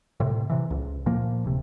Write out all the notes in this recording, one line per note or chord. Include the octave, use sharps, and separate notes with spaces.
A2 C3
C3 E3
C#2
A#2 F3 A#3
D1 C3